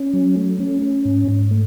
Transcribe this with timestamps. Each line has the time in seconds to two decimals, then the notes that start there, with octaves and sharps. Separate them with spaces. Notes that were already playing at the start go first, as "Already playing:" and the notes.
Already playing: C#4
0.13 F#3
0.36 A3
0.60 C#4
0.82 C#4
1.05 G#2
1.29 G#2
1.51 A3